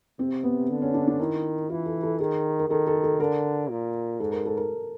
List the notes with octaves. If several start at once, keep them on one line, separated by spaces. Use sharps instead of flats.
C3 C4
B3
D3
C#4
D4
D4
D#3 E4
E3 F4
A4
A4
D#3 G#4
A#4
D#3 A4
A4
A4
D3 A#4
A#2
G#2 A4
A#4
A4
A#4